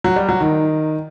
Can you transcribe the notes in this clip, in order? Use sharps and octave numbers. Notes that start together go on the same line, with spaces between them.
F#3
G3
F#3
D#3